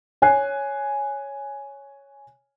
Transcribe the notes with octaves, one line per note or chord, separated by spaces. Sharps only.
C#5 G#5 F#6 C7